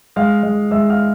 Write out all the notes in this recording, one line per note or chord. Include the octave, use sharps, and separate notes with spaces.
G#3 F5 F6
G#3
G#3 E5 E6
F5 F6